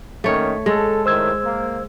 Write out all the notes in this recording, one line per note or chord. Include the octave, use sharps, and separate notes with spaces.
D#3 A3 A#3 C#4 C#5
G#3 A4
A2 D#3 C5 E6 G#6
A#3